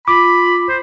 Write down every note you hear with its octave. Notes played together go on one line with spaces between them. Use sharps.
F4 B5 D6
C5